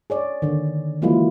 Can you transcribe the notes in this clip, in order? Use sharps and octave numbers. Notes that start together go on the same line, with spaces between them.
G#4 C#5 D5
D3 D#3
E3 F#3 G#3 A#3 E4 F4